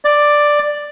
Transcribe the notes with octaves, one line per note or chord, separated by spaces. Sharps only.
D5